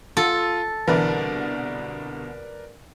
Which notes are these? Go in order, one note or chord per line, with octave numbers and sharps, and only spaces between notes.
F4 A4 A6
C2 B2 D3 E3 A#4 B4 D5